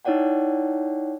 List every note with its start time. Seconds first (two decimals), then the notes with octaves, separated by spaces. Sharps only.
0.05 D#4 E4 C#5 D5 F#5 G5